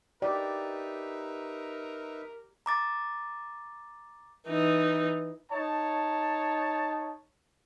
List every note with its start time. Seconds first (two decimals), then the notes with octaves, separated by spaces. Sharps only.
0.22 D#4 G4 A#4 B4 D5 E5
2.66 A#5 D6 A6
4.48 E3 D#4
5.51 D#4 C#5 A5